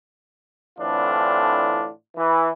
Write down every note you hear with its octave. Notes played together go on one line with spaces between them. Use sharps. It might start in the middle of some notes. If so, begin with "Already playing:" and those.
A2 D3 E3 C4 D4 F4
E3